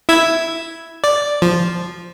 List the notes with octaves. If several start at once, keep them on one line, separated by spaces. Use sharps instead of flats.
E4 E6 G#6
D5
F3